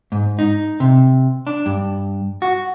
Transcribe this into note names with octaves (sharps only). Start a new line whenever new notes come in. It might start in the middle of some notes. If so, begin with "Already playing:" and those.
G#2
D#4
C3
D4
G2
F#4